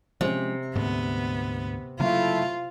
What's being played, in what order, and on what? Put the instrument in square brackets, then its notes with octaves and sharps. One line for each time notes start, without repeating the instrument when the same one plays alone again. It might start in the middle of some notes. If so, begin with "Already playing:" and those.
[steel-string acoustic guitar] C3 [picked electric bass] F3 G#3 C#4
[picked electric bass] D2 G#2 [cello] B3
[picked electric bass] C#3 F#3 A#3 [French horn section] A3 E4 [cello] F4